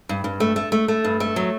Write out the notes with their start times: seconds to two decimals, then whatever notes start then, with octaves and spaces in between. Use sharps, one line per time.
0.09 G2
0.24 G2
0.40 A3
0.56 A3
0.72 A3
0.88 A3
1.04 G2
1.20 A3
1.36 F#3